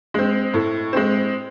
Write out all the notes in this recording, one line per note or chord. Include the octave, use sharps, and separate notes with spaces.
G#3 C4
A2
G#3 C4